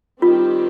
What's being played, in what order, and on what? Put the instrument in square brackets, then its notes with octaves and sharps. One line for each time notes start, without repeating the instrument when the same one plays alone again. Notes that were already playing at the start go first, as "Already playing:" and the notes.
[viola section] D#3 G3 C4 G4 [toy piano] F4